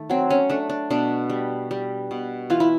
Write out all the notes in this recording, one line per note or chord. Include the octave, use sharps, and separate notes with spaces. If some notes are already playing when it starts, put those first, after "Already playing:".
Already playing: D#3 A3
F#3 C4
C#4
A3 D4
D4
B2 D4
G3
G3
B2
E3 F4
E4